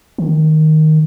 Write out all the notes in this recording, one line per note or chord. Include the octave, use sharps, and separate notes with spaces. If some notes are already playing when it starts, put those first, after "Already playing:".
D#3